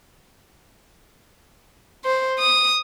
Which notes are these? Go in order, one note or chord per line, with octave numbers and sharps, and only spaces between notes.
C5
D#6